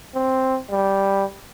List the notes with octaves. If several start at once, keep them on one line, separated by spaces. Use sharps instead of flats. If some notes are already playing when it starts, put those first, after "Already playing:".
C4
G3